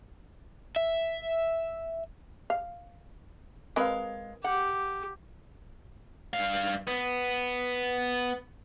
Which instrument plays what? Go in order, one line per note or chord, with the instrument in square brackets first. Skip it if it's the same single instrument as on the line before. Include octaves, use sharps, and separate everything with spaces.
[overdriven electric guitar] E5
[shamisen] F5
[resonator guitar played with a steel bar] G#3 F5 [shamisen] C4 A#4 B4
[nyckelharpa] G4 [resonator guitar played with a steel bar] F#5
[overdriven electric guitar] G2 F5
B3